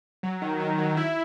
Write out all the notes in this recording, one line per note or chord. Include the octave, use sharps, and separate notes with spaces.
F#3
D#3
D#3
F#3
E4